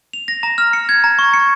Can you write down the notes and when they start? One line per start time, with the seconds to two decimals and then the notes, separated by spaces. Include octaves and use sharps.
0.13 F7
0.28 A#6
0.43 A#5
0.58 F6
0.73 C#7
0.89 G#6
1.04 A#5
1.19 C#6
1.34 C#7